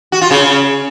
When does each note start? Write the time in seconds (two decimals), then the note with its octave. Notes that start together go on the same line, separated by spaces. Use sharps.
0.12 F#4
0.21 F4
0.31 C#3